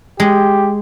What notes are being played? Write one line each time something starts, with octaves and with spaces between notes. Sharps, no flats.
G#3 G4